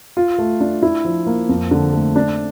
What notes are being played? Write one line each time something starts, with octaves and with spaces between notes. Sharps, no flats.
F4
A3
D4
E4
F3
A#3
F2
D3
A3
D4